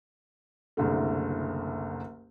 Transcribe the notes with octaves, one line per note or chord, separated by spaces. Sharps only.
F#1 C2 D3 A3